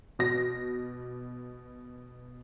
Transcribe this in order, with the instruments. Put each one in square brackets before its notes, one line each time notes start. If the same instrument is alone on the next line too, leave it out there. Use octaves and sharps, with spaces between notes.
[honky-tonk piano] B2 A#6